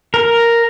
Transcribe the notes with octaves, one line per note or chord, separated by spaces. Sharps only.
A#4